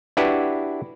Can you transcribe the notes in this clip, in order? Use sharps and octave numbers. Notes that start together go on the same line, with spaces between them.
D4 E4 F#4 G4 B4